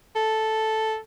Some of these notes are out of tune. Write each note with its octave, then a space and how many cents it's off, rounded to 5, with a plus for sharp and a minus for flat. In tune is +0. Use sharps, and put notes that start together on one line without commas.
A4 -5